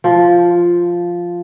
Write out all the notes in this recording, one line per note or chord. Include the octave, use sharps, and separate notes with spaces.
F3